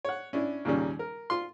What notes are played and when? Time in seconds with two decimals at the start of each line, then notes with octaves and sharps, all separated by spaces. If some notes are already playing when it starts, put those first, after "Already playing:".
0.05 C#5 F#5
0.33 C#4 D4 E4
0.65 D#2 A#2 C#3 G3 C#4
0.99 A#4
1.30 F4 C6